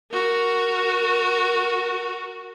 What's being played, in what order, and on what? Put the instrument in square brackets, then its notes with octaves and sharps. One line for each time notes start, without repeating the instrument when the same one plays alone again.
[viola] F#4 A#4